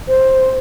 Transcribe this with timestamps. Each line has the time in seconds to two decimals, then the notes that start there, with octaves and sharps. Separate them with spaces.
0.08 C5